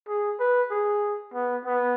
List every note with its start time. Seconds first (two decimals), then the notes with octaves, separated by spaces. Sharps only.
0.09 G#4
0.39 B4
0.71 G#4
1.34 B3
1.66 B3